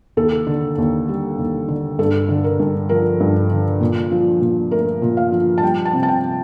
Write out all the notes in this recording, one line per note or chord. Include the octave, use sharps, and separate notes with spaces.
D#2 A4
D3
D#2
G3
D#2
D3
G2 A4
D3
A#4
G2
F3 A#4
G2
D3
A#2
F3
A#2
A3 A#4
A#2
F5
F3
A5
G3 G5
A5
C3
A5
G5